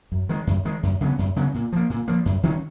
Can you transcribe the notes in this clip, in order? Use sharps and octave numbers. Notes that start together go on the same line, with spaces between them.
F#2
D#3 G#3
F#2
D#3 G#3
F#2
C#3 F#3 B3
F#2
C#3 F#3 B3
A#2
F3 A#3
A#2
F3 A#3
F#2
D#3 F#3 C#4